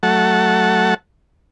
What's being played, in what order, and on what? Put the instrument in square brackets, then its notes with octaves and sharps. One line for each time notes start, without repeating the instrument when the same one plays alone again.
[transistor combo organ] F#3 A3 F#5 A5